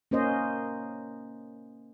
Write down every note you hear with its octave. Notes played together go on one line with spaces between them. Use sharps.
A#3 C#4 C5 D#5